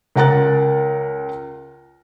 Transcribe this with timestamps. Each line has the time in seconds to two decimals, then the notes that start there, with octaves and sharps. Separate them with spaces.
0.16 C#2 A#4 F#5 A#5 F#6 A6